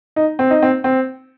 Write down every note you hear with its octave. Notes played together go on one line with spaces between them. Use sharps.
D#4
C4
D#4
C4
C4